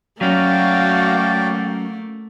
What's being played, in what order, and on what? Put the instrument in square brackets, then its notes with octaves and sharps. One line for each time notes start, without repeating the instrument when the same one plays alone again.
[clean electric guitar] F#3 C#4 [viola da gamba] A3 A#3 [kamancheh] F#4 F5 [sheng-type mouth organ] D5 G5